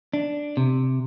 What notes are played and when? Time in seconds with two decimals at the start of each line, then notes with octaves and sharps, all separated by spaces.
0.13 D4
0.57 C3